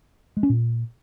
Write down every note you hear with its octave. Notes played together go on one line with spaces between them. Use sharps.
G#3
C#4
A#2